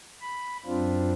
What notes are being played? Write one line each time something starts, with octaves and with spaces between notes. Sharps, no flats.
B5
F#2 C4 D4 F4